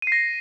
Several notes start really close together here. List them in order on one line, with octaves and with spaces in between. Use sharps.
D#7 C7 A#6